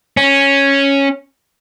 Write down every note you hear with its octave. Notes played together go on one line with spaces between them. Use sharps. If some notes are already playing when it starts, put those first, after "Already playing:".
C#4